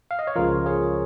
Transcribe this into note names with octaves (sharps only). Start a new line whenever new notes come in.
F5
D#5
C#5
C#2 C#3 F3 F4 A#4
G#4 C#5